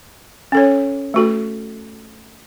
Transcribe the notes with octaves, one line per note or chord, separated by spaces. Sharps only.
C#4 A4 C#5
A3 F#4 A4